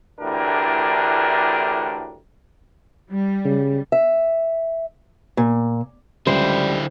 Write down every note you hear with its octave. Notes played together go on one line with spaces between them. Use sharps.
D2 A2 E3 D4 G4 A#4
G3
C#3
E5
A#2
C#2 D3 G3 E4 C5